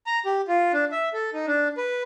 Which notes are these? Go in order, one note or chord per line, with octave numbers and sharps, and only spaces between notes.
A#5
G4
F4
D4
E5
A4
D#4
D4
B4